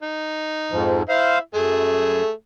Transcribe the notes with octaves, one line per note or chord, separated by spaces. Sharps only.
D#4
F2 G#2 F3
E4 C5 F5
F#2 A3 G#4